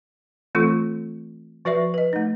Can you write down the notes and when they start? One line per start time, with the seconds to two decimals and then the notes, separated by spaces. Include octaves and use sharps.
0.55 E3 A3 C4 F4 A4 C#6
1.65 F3 F#4 B4 D5 E5 C#6
1.94 B4 D#5
2.13 A3 D#4